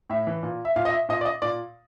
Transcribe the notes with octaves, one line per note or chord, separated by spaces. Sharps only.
A2 E5
E3
A#2
E5
A#2 F5
D#5
E5
A#2 D#5
D5
D#5
A#2 D5